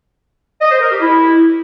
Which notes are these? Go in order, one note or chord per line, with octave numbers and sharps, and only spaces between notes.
D#5
C5
A#4
G4
E4